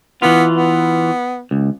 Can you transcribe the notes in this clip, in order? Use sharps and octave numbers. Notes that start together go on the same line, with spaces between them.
E3 B3 F4
B3
C#2